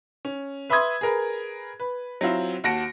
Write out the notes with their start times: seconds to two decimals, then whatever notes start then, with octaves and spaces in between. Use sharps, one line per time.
0.25 C#4
0.70 B4 E5 B5 C6 D#6 G#6
1.01 G#4 A#4 B4
1.80 B4
2.21 F#3 C4 E4 F4
2.64 D#2 F#4 A5 A#6 C#7 D7